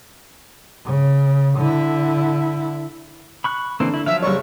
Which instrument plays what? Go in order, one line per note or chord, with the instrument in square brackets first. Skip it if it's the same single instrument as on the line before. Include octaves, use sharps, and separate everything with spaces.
[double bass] C#3
D3 E4
[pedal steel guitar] B5 C#6 F#6
[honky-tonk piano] D3 [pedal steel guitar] E3 A#3 C4
[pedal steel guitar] E4
[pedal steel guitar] F3 F#3 F5 [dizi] E5
[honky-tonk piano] F#1 G3 C#5 [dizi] C#6